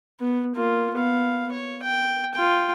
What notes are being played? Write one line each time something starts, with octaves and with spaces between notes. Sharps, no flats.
B3
A#3 F4
B3 F5
C#5
G5
F4 G5